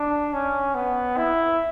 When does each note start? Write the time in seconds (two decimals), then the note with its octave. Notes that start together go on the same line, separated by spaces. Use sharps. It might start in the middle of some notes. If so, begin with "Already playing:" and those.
Already playing: D4
0.33 C#4
0.75 B3
1.17 E4